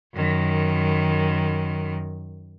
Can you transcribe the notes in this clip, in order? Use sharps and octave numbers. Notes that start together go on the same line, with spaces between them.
F#2 D#3